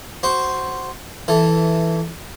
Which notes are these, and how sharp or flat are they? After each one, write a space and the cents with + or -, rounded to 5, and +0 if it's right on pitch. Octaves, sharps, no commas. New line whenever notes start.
F#4 +10 C5 +0
E3 +0 A4 +0